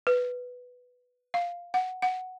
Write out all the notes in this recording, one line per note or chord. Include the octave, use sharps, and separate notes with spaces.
B4
F5
F#5
F#5